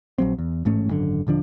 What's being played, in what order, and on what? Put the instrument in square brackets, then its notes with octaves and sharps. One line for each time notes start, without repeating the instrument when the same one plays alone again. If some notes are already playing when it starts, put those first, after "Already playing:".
[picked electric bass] A#1 F#3 C4
E2
A1 G#2 A3 C#4
G#1 F#2 D3
D#1 D3 F3 D4